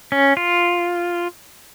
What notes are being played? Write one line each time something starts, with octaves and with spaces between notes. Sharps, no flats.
C#4
F4